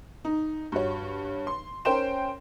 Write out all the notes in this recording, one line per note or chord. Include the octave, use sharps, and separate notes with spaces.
D#4
G2 F#4 C#5
C6
C#4 A#4 C5 G5 C6 E7